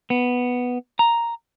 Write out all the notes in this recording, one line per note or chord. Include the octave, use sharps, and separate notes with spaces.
B3
A#5